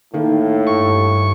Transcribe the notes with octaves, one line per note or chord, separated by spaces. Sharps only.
A2 D#3 A#3
G2 C#6